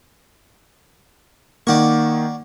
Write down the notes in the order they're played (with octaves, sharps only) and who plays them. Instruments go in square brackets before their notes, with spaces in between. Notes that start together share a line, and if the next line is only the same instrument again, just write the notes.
[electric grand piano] D#3 A#3 [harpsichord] D5 F#5 C#6